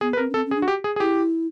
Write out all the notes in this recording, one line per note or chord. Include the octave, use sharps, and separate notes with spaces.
B3 G#4
B4
C4 A#4
C#4
C4 A4
C#4
G#4
D4
F#4
G4
G#4
G#4
E4 G4